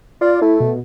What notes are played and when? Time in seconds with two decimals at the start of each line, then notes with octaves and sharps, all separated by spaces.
0.21 F4 D5
0.42 A3 E4
0.60 B2